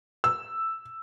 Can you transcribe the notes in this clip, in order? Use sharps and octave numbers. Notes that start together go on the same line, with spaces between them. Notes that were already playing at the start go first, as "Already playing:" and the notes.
E6